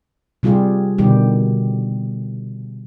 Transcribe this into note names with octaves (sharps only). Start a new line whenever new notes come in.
C3 G3 F4 G4 G#4
B2 D3 D#3 G3 G4